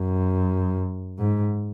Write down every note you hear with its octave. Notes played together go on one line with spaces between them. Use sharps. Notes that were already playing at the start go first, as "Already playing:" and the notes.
Already playing: F#2
G#2